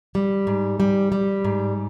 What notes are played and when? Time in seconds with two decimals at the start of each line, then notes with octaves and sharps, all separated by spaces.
0.15 G3
0.47 G#2
0.80 G3
1.12 G3
1.44 G#2